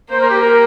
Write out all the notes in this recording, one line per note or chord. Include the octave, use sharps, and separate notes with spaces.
A#3 C5
A#4
G4
A#4